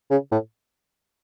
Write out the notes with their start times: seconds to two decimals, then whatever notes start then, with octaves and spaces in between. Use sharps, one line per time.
0.11 C#3
0.32 A2